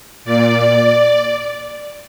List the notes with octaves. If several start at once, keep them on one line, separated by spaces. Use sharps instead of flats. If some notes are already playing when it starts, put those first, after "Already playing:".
A#2 D5